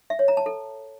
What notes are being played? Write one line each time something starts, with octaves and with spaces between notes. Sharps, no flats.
E5
C#5
A#5
A5
A4